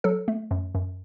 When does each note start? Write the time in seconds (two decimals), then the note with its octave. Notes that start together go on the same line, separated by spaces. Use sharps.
0.04 F#3 A4
0.28 A3
0.51 F#2
0.75 F#2